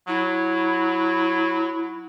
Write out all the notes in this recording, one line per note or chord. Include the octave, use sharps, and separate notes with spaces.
F#3 E4